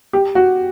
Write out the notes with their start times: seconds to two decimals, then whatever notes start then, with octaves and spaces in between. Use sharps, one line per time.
0.13 G4
0.35 F#4